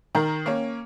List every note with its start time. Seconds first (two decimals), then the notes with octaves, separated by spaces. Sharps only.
0.15 D#3 A#4
0.46 A#3 C#4